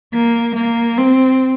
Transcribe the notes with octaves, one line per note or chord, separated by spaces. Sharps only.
A#3
A#3
C4